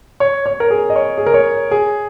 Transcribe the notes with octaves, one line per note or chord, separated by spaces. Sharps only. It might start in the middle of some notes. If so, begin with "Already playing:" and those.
C#5
C#5
A#4
G#4
D#5
C#5
G#4
A#4
C#5
G#4